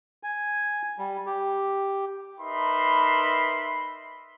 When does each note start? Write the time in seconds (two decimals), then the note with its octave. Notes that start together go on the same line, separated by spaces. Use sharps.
0.23 G#5
0.98 G3
1.26 G4
2.39 D#4 A#4 B4 E5 B5 C6